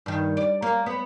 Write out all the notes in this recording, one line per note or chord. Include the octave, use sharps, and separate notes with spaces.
G2 D#3
D5
A#3
B3